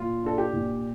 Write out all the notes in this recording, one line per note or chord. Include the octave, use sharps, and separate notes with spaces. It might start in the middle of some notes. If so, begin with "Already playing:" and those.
Already playing: A#2 F4
D4 A4
G4
A#2